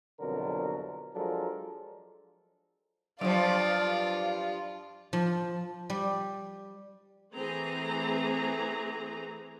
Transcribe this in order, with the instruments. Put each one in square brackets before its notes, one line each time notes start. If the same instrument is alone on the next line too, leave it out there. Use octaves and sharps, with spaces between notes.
[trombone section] C2 F2 B2 D3 F#3 A#4
F3 F#3 G#3 D4 A4 A#4
[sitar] G2 F3 [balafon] F#3 [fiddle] F4 [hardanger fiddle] D5
[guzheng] F3
G3
[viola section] E3 A3 C4 G#4 A#5